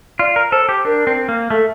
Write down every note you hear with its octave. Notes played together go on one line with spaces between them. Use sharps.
F4 D5
A#4
A4 C5
G4
D4 A#4
C4
A#3
A3 A4